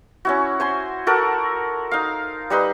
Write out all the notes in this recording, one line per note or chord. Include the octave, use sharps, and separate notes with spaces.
C#4 E4 F#4
C5 G#5 C6
F#4 A4 A#4 F#5
D#4 F5
G3 D#4 B4 C6